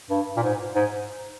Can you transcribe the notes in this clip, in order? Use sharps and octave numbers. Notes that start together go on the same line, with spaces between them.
G2
A#2
G#2
G#2